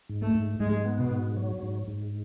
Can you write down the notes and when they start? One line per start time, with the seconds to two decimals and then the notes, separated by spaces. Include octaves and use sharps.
0.09 G#2
0.22 A3
0.35 G#2
0.60 G#2 G#3
0.85 B3
0.98 B2
1.10 G#2
1.37 F#3
1.63 G#2
1.88 G#2